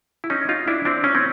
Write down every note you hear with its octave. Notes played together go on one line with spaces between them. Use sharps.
E4
C#4 D#4
D#4 F4
D4 E4
C4 D4
C#4
C4